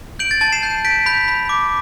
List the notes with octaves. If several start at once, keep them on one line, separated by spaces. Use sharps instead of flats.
G6 D7 F#7
A6
A5 A6
C7 E7
G6
G6 B6 D7
B5 G6 B6
B5
D6